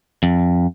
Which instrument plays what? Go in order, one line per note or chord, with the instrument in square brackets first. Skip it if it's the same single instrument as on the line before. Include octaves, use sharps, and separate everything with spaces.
[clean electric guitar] F2